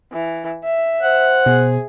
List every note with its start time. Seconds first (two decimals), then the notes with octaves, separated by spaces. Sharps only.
0.13 E3
0.64 E5
1.02 C5 F#5
1.46 B2 G#4